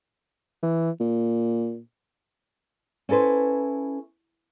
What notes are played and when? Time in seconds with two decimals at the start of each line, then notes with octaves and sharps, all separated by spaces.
0.63 E3
1.00 A#2
3.09 C#4 E4 A4 B4 C5